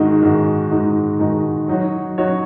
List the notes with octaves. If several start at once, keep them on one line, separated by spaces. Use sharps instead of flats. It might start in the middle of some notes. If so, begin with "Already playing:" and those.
Already playing: G#2 D#3 G#3 D#4 F#4
G#2 D#3 G#3 D#4 F#4
G#2 D#3 G#3 D#4 F#4
G#2 D#3 G#3 D#4 F#4
F#3 D#4 F#4 C#5
F#3 D#4 F#4 C#5